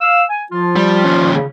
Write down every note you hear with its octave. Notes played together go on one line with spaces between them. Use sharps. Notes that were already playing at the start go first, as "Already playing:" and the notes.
F5 E6
G#5
F3 F4
G3
D#2 C#4
C#3